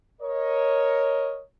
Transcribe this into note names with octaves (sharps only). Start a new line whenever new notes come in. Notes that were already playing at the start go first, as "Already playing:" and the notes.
A#4 C#5 D#5